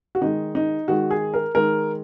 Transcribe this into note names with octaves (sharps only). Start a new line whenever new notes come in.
F#4
D#3 G#3 D#4
D#4
D#3 G#3 F#4
G#4
A#4
D#3 G#3 A#4